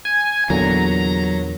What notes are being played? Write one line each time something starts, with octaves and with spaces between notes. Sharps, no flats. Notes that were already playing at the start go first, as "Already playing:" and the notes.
G#5
E2 A#2 D3 F#3 A#5